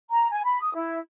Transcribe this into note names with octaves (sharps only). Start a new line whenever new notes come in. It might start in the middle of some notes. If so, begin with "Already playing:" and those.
A#5
G#5
B5
D#6
E4